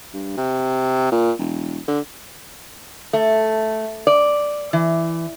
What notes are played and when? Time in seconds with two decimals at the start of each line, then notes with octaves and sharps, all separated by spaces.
0.14 G2
0.37 C3
1.12 A#2
1.39 E1
1.88 D3
3.13 A3
4.07 D5
4.73 E3